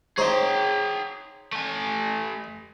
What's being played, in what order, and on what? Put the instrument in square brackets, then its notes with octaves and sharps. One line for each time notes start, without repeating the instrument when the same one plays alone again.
[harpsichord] D#4 C5 C#5 [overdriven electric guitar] G#4 G5
[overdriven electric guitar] A3 G#5